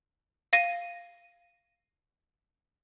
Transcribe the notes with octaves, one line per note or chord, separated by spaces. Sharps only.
F5 A#6 D#7